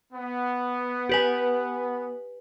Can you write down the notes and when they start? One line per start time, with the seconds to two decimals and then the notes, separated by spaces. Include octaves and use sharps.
0.13 B3
1.09 G4 B4 G#5